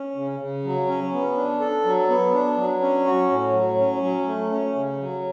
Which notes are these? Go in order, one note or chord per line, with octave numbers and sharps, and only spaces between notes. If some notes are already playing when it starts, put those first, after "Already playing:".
Already playing: C#4
C#3
C#3
F#3
C#4
B3
D4
A4
F#3
B3
D4
F#3
C#4
F#4
A2
F#3
C#4
F#3
A3
C#4
C#3
F#3